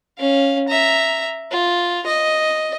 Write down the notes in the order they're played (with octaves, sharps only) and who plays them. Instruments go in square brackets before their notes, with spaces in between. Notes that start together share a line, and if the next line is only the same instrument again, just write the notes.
[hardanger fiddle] C#4 F5
E5 A#5
F4
D#5